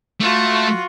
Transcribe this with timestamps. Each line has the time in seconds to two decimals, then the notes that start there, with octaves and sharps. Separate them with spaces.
0.21 A3 F4 F#4